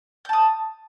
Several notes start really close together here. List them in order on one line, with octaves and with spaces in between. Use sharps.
G6 A5 D#6